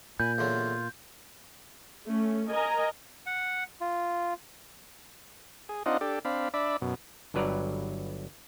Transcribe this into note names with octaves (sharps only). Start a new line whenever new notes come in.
A#2 G#5 B5 G6
E2 D3 F#3 F4
A3 C#4
A#4 D#5 G#5 A#5
F#5
F4
G#4
C4 D4 D#4 F4 D#5 F#5
D4 G4 A4
C4 D4 F5 B5
D4 D5 E5 B5
F#2 B2
G1 G2 F#3 B4 D5 A#5